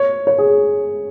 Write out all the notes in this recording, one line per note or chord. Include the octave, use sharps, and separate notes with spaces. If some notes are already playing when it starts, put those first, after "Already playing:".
Already playing: C#5
C#5
G#4